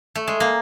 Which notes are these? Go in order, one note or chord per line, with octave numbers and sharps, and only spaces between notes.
A3
G#3
A#3